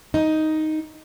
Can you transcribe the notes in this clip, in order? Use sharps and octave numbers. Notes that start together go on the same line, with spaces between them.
D#4